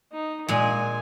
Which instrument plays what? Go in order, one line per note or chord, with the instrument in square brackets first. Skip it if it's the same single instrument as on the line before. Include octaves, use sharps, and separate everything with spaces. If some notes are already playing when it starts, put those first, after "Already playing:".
[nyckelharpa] D#4
[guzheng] A#2 G#3 [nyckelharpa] G#5